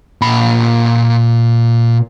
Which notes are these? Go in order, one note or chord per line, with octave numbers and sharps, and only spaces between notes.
A#2 B5